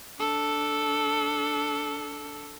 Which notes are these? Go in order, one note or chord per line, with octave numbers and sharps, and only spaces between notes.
D4 A4